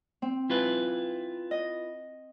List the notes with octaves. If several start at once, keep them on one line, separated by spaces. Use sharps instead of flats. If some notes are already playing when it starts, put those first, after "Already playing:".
C4
E4 F4 B4
D#5